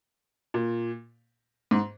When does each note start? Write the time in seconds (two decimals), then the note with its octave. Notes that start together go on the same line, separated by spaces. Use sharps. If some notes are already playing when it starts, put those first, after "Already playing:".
0.54 A#2
1.71 G#2